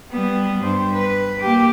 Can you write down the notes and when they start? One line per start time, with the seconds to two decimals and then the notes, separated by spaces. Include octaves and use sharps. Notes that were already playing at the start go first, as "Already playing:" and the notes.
0.12 G3 B3
0.59 G2 C5
0.94 B4
1.40 A#3 G4